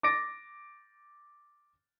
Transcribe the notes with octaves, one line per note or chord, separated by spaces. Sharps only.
D6 A6 A#6 D7